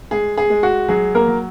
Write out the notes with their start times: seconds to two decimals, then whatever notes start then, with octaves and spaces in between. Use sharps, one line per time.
0.11 G#3 G#4
0.37 G#4
0.50 G#3
0.63 F#4
0.88 F#3 G#4
1.15 A#3 A#4
1.28 F#3